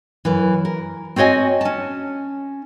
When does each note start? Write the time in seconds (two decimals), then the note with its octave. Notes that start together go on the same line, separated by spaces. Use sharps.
0.25 F#2 E3
0.65 A#4
1.16 C4 F#4 C#5 D#5 G#5
1.61 C#4 A5